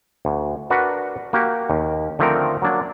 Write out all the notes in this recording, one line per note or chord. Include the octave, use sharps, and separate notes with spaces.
D2
D4 F#4 A#4 B4 F#5
A#3 F#4 G4
D#2
D3 D#3 F3 A3 C4 A#4
F#3 A#3 D4